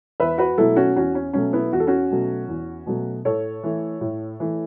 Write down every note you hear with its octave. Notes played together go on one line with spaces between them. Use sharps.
E2 B4 E5
F#4 B4
B2 F#3 A3 E4 A4
C#4 F#4
E2 C#4 F#4
C#4
B2 F#3 A3 C#4
B3 E4
E2 F#4
A4
C#4 F#4
B2 F#3 A3
E2
B2 F#3 A3
A2 A4 C#5
E3 A3
A2
E3 A3